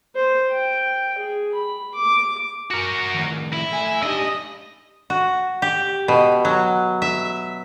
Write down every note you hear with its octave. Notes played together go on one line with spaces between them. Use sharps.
C5
G5
G#4
B5
D6
F#4 A#4
A2 D#3
E4
A3 G#5
D4 D#4 G4 D#5
F#4
G4
B2
F#3
E5